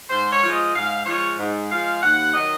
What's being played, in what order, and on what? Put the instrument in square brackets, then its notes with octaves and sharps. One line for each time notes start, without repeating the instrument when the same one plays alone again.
[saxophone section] G#2 C5
C#5
F3 G#3
D#5
G#2 F5
F3 G#3 C#5
G#2
F3 G#3 F5
D#2 F#5
D#3 F#3 D#5